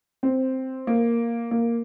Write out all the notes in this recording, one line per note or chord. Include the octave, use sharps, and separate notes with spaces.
C4
A#3
A#3